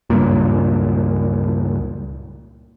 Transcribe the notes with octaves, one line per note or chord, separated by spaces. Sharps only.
C#2 G2 A#2